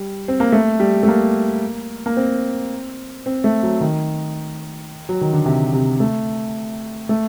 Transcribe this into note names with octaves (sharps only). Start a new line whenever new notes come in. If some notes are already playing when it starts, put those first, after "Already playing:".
Already playing: G3
C4
A#3
A3
G3
A3
A#3
A#3
C4
C4
A3
F#3
D#3
F#3
D#3
D3
C3
C3
A3
A3